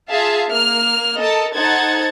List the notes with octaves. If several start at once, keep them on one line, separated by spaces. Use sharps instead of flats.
F4 G#4 E5 F5 A5
A#3 F6
A4 A#4 D#5 A5
D#4 A4 C5 F#5 G#6 A6